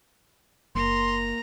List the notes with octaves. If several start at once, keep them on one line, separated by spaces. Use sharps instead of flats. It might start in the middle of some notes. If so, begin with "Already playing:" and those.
F#1 A#3 A#5 C6